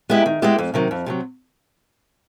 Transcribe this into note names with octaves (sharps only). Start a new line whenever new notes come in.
G#3 B3 E4 G4
D#3
G#3 B3 E4 G4
F2
C3 D#3 F#3
F2
C3 D#3 F#3